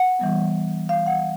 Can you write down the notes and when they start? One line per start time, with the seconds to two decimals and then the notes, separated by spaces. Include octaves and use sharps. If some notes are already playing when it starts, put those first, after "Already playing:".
Already playing: F#5
0.19 E3 G3 B3
0.89 F5
1.07 F#5